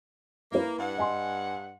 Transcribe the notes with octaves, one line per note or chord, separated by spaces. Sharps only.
A#3 E4 B4
G2 F#5
D#5 G#5 C6